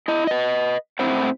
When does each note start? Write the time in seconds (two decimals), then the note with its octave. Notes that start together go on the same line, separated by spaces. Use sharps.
0.08 E4 D#5
0.27 B4 D#5
0.99 A2 C4 E4 C5 F#5